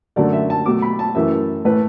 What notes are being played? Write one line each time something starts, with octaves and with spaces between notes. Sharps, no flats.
F#2 D3 F#3 A3 D5
E5
A5
B2 F#3 A3 D6
B5
A5
F#2 E3 A3 E5
A2 E3 A3 B4